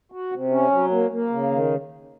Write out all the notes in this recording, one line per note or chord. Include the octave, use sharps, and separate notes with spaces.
F#4
C3
C#4
F#3
A#3
A#3
C#3
D#3